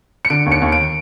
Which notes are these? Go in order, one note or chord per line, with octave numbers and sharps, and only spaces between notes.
C#7
D3 D7
D#2
C#7
D#2
D7